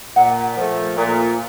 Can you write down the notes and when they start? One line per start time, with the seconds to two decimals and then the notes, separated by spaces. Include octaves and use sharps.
0.16 A#2 F#5
0.57 F3 A3
0.96 A#2